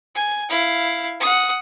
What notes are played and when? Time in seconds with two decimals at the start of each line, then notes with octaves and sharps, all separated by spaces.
0.15 G#5
0.50 E4 F5
1.21 F#5 D#6